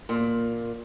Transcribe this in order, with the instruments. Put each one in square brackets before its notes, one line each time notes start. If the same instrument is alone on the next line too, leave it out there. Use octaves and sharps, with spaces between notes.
[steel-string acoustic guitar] A#2